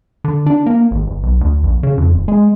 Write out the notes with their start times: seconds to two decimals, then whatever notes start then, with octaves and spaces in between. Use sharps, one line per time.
0.24 D3
0.46 D4
0.66 A#3
0.91 G#1
1.07 G1
1.23 B1
1.41 D2
1.64 A#1
1.83 C#3
1.98 F2
2.14 D#1
2.28 G#3